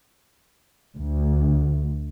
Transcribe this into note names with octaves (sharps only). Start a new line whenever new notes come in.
D2